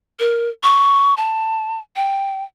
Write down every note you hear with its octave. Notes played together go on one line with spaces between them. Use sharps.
A#4
C#6
A5
G5